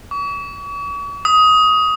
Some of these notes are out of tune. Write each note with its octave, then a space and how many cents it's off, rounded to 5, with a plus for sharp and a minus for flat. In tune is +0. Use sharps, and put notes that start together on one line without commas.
C#6 +45
D#6 +15